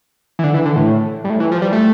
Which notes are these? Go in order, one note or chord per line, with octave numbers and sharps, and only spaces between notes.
E3
D3
E3
D3
A2
G2
A2
E3
F3
G3
A3